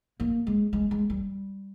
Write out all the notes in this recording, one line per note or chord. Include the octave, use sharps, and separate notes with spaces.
A#3
G#3
G#3
G#3
G3